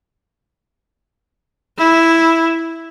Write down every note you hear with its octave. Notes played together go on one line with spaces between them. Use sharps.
E4